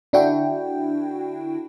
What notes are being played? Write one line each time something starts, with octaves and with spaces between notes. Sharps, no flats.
D3 D4 E4 F#4 G5